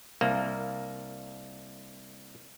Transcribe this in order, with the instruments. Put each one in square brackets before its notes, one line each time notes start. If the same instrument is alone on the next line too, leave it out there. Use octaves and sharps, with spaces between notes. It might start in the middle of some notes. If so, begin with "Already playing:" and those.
[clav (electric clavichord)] C2 A#3